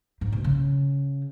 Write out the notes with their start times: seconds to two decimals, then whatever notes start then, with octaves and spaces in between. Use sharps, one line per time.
0.21 G#2
0.32 B2
0.44 C#3